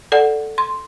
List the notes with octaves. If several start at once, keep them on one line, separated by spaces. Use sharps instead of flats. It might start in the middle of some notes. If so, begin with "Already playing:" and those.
A4 D5 F#5
C6